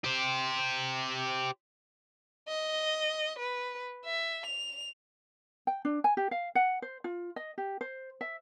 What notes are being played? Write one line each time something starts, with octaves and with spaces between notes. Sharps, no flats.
G4 C5
D#5
B4
E5
F7
G5
D4
G#5
G4
F5
F#5
C5
F4
D#5
G4
C5
E5